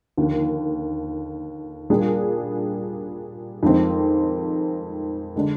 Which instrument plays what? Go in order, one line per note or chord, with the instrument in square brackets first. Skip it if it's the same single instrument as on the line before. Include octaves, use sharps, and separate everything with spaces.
[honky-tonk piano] D#2 D3 F3
A#2 G3 D4 G#4
F2 D#3 G#3 C4
D3 G#3 D4